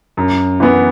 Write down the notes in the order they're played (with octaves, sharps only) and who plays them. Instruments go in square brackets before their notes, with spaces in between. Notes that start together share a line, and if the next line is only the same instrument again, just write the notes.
[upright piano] F#2
E3 B3